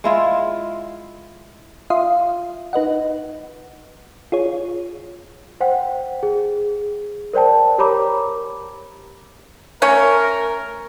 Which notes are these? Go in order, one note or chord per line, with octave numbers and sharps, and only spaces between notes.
G#3 E4 F4
F4 E5 F5 C6 D#6
D#4 B4 D#5 F#5
F4 G#4 C#5
C5 F#5 G5
G#4
A#4 C5 D5 G5 A5
G4 A#4 C#5 A#5 B5 D6
A3 C#4 A#4 C#5